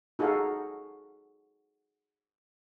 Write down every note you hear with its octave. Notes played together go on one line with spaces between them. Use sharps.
D#4 F#4 G#4 A4 F5